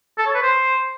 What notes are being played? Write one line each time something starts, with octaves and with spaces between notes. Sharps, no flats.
A4
C#5
B4
C5